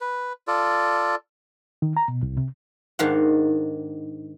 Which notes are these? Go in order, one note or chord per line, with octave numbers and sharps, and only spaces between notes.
B4
F4 A4 D5
D#3
A#5
B2
C2
C3
G#2 D#3 D4 F5 F#5